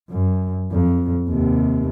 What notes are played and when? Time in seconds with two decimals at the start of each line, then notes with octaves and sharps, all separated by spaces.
0.10 F#2
0.72 F2
1.29 D#2 C3